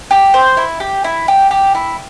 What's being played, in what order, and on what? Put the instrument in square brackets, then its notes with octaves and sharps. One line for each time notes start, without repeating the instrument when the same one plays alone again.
[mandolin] G4
C5
E4
G4
E4
G4
G4
E4